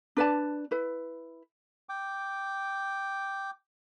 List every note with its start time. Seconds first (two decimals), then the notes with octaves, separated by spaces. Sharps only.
0.17 D4 B4 D5 A5
0.71 E4 B4
1.89 G5 D6